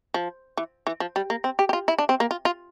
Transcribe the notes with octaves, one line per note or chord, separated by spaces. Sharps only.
F3
E3
E3
F3
G3
A#3
C4
G4
G4
F4
E4
D4
C4
A#3
F4
F4